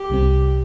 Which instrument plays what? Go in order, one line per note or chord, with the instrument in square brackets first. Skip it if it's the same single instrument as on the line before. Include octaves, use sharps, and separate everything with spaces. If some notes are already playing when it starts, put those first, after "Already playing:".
Already playing: [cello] G4
[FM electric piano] C2 C3 G3 C4